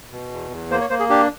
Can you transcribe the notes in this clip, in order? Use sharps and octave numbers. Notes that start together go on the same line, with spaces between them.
B2
E2
E2
A#3 C5
C#5
A#3 C5
G#4
D4 G4